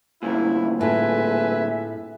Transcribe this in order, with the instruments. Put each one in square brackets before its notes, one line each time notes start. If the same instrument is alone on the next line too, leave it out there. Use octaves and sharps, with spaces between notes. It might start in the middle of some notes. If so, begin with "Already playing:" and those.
[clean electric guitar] D2 G2 A#2 [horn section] E4
[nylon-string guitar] A2 A3 F4 [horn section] G#4 B4 G#5 [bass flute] E5